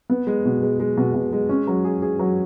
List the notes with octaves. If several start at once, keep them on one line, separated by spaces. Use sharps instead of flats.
B3
G#3
B2
G#3
G#3
B2
B2
G#3
C#4
F#3
G#4
G#4
F#3